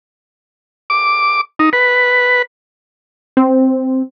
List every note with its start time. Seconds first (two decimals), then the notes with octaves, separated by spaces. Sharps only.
0.90 D6
1.59 D#4
1.73 B4
3.37 C4